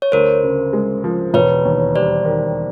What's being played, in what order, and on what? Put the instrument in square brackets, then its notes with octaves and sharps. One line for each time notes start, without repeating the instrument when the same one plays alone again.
[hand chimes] C#5
[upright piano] D2 [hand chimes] A#4 C5
[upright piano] C#3
G#3
F3
[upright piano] E1 [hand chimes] B4 C#5
[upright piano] D#2
[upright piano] G3 [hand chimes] C5 D5
[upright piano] D#3